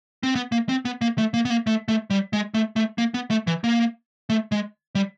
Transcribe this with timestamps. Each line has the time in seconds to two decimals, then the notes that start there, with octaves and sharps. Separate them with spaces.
0.23 C4
0.35 B3
0.52 A#3
0.69 C4
0.85 B3
1.01 A#3
1.18 A3
1.34 A#3
1.45 B3
1.50 A#3
1.67 A3
1.88 A3
2.10 G3
2.33 G#3
2.54 A3
2.76 A3
2.98 A#3
3.14 B3
3.30 A3
3.47 E3
3.64 A#3
4.30 A3
4.52 G#3
4.95 G3